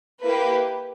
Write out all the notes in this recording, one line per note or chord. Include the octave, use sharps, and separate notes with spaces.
A#3 E4 G4 B4